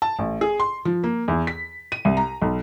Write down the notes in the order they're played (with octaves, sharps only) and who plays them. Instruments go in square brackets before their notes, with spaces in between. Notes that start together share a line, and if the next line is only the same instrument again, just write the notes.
[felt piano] A5
A1
G#4
C6
F3
A#3
E2
B6
D#7
C2
A#5
B1